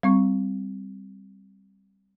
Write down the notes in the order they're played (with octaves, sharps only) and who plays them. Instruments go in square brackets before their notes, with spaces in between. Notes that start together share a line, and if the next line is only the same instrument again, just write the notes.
[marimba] G3 C4 C#6